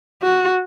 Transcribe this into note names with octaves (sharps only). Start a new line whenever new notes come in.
F#4